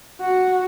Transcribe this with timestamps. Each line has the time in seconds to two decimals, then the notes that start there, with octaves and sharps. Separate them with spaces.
0.21 F#4